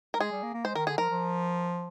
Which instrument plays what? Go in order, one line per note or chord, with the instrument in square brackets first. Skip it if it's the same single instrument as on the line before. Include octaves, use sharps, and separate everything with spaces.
[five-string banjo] A#4
[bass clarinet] G#3 [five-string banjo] G#4
[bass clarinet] G3
A#3
A#3
[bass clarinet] G#3 [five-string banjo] C5
[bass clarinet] D#3 [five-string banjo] A#4
[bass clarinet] D3 [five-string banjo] G#4
[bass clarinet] F3 [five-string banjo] A#4
[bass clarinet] F3